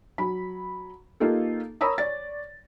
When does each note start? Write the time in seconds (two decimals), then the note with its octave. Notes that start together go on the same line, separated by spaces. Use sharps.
0.18 F#3 B5
1.20 A#3 D#4 F4 G4 A4
1.81 A#4 C#5 A#5 B5 D#6 E6
1.98 C#5 D5 A6